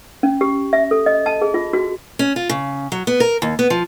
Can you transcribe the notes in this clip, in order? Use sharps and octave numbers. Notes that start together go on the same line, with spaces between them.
C#4
G4
E5
A4
D#5
A5
G#4
F4
F#4
C#4
F4
C#3
F#3
B3
A#4
D#2
B3
F3